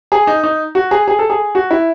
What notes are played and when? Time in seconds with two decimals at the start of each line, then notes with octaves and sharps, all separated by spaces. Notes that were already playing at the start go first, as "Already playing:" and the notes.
0.12 G#4
0.27 D#4
0.44 D#4
0.75 F#4
0.91 G#4
1.08 G#4
1.19 A4
1.30 G#4
1.55 F#4
1.71 E4